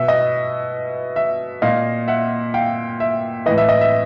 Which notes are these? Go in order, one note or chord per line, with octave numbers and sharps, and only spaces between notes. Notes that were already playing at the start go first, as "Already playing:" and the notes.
Already playing: B2 E5
D#5
E5
A#2 D#5 F5
E5 F#5
F5 G5
E5
A2 E3 D#5
E5
D#5
E5